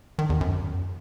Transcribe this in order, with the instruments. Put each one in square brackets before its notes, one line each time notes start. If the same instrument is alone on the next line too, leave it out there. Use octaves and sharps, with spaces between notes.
[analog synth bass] D#3
E2
F#2